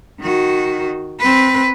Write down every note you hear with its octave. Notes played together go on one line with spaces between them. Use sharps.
D#3 F#4
C4 B4